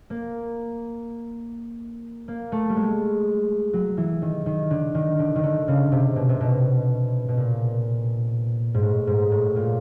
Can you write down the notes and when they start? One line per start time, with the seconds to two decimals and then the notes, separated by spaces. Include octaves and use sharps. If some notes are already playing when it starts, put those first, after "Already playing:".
0.10 A#3
2.28 A#3
2.52 A3
2.69 G3
2.76 G#3
3.73 F#3
3.97 E3
4.22 D#3
4.46 D#3
4.70 D3
4.95 D#3
5.19 D3
5.36 D#3
5.43 D3
5.68 C#3
5.92 C3
6.16 B2
6.29 C3
6.41 B2
7.28 B2
7.38 A#2
8.74 G#2
8.82 A2
9.07 G#2
9.32 A2
9.56 A#2